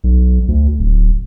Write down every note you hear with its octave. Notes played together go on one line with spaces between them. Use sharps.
B1
D2
D1